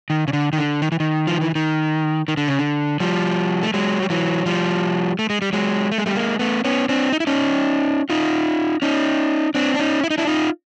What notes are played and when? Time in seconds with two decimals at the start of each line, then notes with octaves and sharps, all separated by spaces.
0.10 D#3
0.28 C#3
0.33 D3
0.53 D#3
0.58 D3
0.82 D#3
0.92 E3
1.00 D#3
1.27 F3
1.41 E3
1.55 D#3
2.28 D#3
2.37 D3
2.48 C#3
2.59 D3
3.00 F3 G3
3.63 A3
3.74 F#3 G#3
4.02 G3
4.10 E3 F#3
4.46 F3 G3
5.19 A3
5.30 G#3
5.42 G3
5.53 F#3 G#3
5.92 A3
5.98 G#3
6.06 G3 A3
6.15 G#3 A#3
6.39 A3 B3
6.64 B3 C#4
6.89 C4 D4
7.12 D#4
7.20 E4
7.27 C#4 D#4
8.10 D#4 F4
8.82 C#4 D#4
9.55 C4 D4
9.74 D4
9.79 C#4 D#4
10.04 E4
10.10 D#4
10.18 D4 E4
10.27 D#4 F4